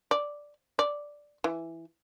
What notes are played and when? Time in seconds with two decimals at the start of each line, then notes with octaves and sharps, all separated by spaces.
0.11 D5
0.79 D5
1.44 E3